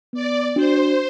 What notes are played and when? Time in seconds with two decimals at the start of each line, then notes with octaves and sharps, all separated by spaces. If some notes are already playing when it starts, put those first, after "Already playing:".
0.13 B3 D5
0.56 D4 F#4 C5